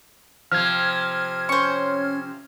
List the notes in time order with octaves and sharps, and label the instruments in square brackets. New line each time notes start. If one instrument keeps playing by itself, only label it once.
[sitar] C3 F3 [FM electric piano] F6 G#6
[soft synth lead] C#4 [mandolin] C5 C#6